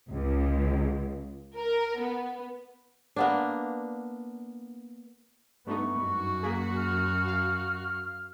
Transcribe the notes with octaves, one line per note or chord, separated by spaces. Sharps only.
C#2
A#4
B3
A#3 B3 D4
G2 A3 B3 D#4 C#6
F#2 F#4
A#3 G#4 B6
F6
F5